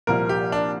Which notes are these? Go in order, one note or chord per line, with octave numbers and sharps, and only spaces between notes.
C2 A#2 F3 A#3 A#4
G4
D4